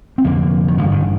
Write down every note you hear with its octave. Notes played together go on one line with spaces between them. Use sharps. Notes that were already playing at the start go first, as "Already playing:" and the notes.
C4
F1 F2 D3 A#3
D#3
A1 G2 D3 F3
D#3